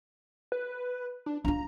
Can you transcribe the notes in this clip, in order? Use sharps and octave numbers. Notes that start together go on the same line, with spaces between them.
B4
D4
D4 F4 A#5